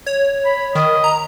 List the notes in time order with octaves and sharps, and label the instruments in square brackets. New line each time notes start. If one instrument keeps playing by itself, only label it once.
[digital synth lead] C#5
[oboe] B5
[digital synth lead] D#3 [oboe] D#5
[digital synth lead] A#5